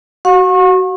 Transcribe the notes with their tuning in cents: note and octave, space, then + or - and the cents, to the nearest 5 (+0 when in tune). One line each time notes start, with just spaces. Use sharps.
F#4 +20 F#5 -45 C#6 -35